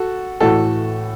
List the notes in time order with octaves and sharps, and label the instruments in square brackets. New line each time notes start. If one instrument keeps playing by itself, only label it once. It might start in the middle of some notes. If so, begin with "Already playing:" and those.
Already playing: [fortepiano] F#4 A4
[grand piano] A2 E3 A3 [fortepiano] F#4 A4